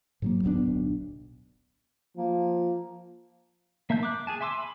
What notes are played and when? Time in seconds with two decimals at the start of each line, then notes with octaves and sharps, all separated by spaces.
0.22 G#2 F#3 A#3
0.43 D1 B1 B3 D4
2.17 F3 A#3
3.90 A#3 E5 A5 G6
4.03 D6 F#6
4.27 G#4 G#5 A5
4.41 E5 G#5 C6 D6 E6
4.60 B5